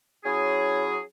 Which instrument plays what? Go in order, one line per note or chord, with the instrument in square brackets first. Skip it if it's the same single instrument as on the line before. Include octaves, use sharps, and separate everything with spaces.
[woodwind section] F#3 C#4 E4 G#4